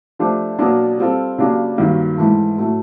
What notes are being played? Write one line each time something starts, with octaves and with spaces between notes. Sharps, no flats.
F3 A3 D4 G4 C5
B2 F#3 A#3 D4
G3 C4 F4 A4
C#3 F#3 A#3 D4 G4
G2 D#3 F#3 A#3
G#2 E3 A3
A2 F#3 A3